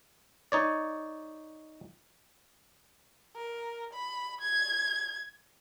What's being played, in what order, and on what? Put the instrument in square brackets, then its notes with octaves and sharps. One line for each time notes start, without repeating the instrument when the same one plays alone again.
[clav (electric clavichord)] D#4 C#5 D5
[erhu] A#4
B5
G#6